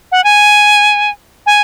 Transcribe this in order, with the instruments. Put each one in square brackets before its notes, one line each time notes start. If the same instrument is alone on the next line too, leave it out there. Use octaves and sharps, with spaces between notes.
[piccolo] F#5
G#5
G#5